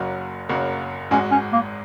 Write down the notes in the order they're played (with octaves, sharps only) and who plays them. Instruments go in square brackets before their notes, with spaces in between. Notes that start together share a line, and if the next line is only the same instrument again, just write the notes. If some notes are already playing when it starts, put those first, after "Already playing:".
Already playing: [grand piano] F#1 F#2 C#3 A#3 F#4
F#1 F#2 C#3 A#3 F#4
[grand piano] G#1 G#2 G#3 F#4 [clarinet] C#4
[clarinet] C#4
A#3